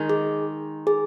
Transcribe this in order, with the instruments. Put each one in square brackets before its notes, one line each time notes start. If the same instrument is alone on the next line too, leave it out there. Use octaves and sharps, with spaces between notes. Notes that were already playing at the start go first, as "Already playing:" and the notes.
Already playing: [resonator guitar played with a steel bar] D#3 G#3 D#4
[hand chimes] G#4
G#4